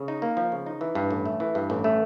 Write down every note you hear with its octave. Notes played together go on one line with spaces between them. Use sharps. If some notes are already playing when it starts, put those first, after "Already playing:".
Already playing: C#3
D#4
A#3
F3
C#3
D#4
E3
G2
A1
A3
E3
G2
A1
A3